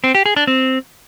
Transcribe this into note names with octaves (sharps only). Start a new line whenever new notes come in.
C4
G4
G#4
D4
C4